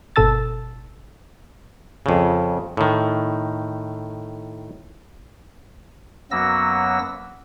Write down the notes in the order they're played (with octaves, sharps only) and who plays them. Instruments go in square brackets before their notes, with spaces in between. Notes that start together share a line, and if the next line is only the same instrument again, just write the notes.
[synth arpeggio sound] G1 B2 A4 A5 E6 A6
[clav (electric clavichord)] F2 C#3
A2 D#3
[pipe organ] F#2 F#3 A#3 B3 E6 A#6